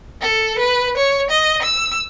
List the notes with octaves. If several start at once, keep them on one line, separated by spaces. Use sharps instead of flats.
A4
B4
C#5
D#5
E6